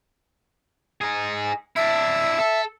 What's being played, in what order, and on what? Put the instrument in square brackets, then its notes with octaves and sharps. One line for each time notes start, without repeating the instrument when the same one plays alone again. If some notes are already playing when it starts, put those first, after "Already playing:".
[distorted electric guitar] D#4 G#4
[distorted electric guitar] D4 E4 [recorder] E5
[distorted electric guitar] A4